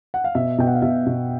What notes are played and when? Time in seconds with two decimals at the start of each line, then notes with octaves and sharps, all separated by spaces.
0.14 F#5
0.24 F5
0.35 B2 E5
0.58 B2 G5
0.67 F#5
0.75 F5
0.82 B2 E5
1.06 B2